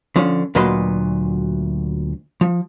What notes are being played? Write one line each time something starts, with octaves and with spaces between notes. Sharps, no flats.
D3 F3 C#4
D2 A#2 F#3 B4 D#5 C6
F3